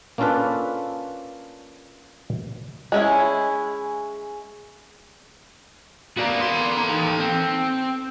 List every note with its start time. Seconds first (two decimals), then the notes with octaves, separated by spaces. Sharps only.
0.18 A#3 C#4 D4 F4 A4 B4
2.92 G#3 C#4 E4
6.17 A#3 B3 F#4 D5
6.41 A4 C6
6.89 D#2
7.20 C4